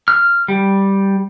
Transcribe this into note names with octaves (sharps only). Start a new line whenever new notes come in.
F6
G3